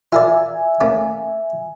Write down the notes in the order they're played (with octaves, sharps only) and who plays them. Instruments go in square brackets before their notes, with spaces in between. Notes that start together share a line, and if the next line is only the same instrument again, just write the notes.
[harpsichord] F4 A#4 D5 [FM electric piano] E5 G#5
[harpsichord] A3 A#3 C#4